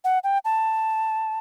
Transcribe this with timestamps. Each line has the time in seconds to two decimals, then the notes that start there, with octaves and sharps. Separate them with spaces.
0.04 F#5
0.24 G5
0.45 A5